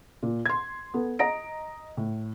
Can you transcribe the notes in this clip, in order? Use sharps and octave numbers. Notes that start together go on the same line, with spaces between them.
A#2
C6 G#6
B3 A4
D#5 A#5 A#6 D7
A2